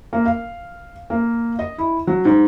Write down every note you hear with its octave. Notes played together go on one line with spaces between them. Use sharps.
A#3
F5
A#3
D#5
E4
F#3
G#2